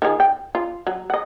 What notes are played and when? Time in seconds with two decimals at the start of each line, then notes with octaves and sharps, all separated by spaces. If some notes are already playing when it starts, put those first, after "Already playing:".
0.02 D#3 F4 G#4
0.20 G5
0.55 F4
0.87 F#3
1.10 D#5 F#5